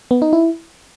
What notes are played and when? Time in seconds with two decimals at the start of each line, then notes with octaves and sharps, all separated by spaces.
0.11 B3
0.22 D#4
0.33 E4